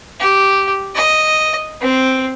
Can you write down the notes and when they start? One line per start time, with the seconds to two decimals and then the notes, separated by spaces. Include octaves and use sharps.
0.20 G4
0.95 D#5
1.81 C4